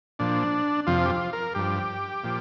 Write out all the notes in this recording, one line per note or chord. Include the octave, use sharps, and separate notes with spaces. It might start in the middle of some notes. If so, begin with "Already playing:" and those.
A#2 F3 D4
F2 C3 F3 F4
G4
F4
A#4
G2 F3 G4
A#2 F3